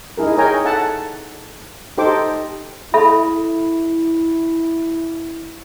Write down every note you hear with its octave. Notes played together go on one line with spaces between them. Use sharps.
D#4 E4 G#4 A#4
G#4 A#4 C#5 G5 G#5 A#5
A4 E5 F#5 A5
D#4 G4 A4 C5 G5 D6
E4 A4 E5 B5